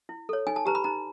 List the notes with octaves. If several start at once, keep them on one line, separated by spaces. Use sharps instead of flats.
E4
A4 C#5
D#4 G#5
A5
G4 B4 A#5
B5
D#4 A#5